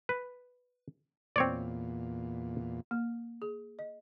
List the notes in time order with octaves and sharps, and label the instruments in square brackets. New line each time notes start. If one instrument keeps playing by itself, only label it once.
[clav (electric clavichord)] B4
[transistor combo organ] E2 A#2 [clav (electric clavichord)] C4 C#5 D5
[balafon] A#3
G#4
D#5